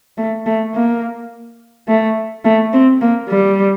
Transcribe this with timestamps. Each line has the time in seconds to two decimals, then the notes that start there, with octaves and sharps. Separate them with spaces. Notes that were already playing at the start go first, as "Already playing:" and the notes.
0.17 A3
0.46 A3
0.74 A#3
1.88 A3
2.45 A3
2.73 C4
3.02 A#3
3.29 G3